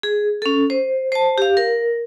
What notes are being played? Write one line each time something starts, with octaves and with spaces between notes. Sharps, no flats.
G#4
C#4 A4
C5
C5 A5
G4 F5
A#4